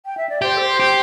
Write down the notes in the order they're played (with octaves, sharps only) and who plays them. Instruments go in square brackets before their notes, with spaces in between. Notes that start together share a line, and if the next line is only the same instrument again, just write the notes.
[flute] G5
E5
D5
[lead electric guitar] G4 [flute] C5
[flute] A4
C5
[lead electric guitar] G4